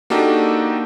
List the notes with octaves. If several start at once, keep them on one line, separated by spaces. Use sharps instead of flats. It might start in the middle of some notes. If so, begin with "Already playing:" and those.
A#3 D4 D#4 F#4 G4 A4